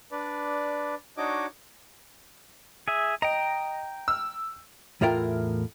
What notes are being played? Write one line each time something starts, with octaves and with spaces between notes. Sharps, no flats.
D4 B4 D5
D4 D#4 F#4 C#5 D#5 D6
G#4 E5
D#5 G5 A#5
E6 F6
E2 A2 E4 F4 A#4 G5